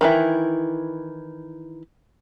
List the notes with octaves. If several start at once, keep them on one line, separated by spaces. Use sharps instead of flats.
D#3 E3 E4